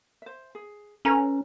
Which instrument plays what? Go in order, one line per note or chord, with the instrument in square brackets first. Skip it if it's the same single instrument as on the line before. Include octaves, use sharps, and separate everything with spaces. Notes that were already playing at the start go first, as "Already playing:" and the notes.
[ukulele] C5 E5
G#4
[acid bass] C#4 [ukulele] A4 B4 A#5